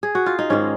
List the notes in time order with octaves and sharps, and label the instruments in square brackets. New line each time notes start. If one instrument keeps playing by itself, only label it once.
[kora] G#4
F#4
F4
D#4
G#2 D#3 G#3 C#4